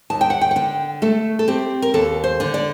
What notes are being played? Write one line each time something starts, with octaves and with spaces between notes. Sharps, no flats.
D#2 A5
G5
F#5
G5
F#5
D3 G5
A3 A4
A4
C4 G4
A#4
D#2 A4
C5
D3
D5